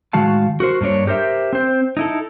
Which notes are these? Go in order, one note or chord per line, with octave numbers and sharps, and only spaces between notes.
A2 D#3 G#3 F#4 F5 A5
F#4 A#4 C5
G2 A#3 D4 C#5
G4 A#4 C5 E5
C4 C5
D#4 E4 A4